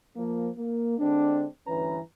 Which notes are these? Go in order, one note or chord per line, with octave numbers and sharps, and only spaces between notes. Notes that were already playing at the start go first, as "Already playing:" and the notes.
F3 A#3
A#3
D3 G#3 C4 D4
D2 G2 E3 C#4 B4 A#5